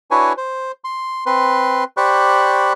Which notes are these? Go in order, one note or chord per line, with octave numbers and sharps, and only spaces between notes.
D4 E4 F#4 B4 C#5 G#5
C5
C6
C4 B4 C6
G4 C5 D5 B5 C#6 F#6